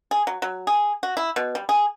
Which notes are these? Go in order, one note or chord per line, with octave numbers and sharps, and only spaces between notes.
G#4
F#3
F#3
G#4
F#4
E4
B2
G3
G#4